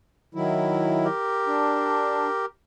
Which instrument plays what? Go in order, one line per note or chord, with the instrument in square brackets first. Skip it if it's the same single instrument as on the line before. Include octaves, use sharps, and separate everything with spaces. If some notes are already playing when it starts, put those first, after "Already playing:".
[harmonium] D#3 F#3 E4
[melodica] G4 A#4
[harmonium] D4